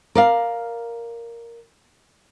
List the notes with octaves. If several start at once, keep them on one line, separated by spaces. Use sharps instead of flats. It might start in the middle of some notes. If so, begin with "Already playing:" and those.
A#4 D5 F5